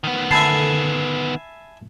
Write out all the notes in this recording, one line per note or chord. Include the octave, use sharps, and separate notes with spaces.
D#3 B3
D3 E5 G#5 A5 B5 A6 C7